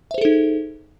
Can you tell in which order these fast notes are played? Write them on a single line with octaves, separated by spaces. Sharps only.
E5 C5 G#4 A4 D#4